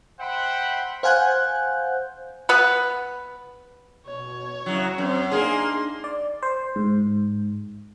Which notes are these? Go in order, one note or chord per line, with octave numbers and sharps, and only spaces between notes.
C5 E5 F#5 G5 B5
C5 F5 F#5 G#5 F#6 G6
B3 B4
B2 C#5
F#2 C#3 F#3 E4 F#4
F#2 C4
A#3 D4 D#4 G#4 C6
D5
C5
G#2